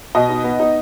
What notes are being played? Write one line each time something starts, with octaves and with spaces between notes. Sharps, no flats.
B2 D#5
D#4
B3
D#4